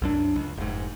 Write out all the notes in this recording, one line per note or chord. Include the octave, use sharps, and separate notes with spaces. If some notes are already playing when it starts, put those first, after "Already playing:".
C2 F#2 D4
C#2
F1 G#2